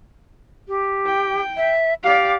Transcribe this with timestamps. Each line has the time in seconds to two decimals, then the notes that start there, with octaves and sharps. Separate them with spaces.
0.68 G4
1.06 G5
1.57 E5
2.04 G4 D5 F5